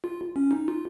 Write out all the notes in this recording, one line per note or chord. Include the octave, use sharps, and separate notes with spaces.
F4
C#4
D#4
F4